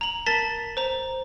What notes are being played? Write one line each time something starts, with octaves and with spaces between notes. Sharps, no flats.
A#5 F#7
A#4 A5 A6 B6 G7
C5 A#5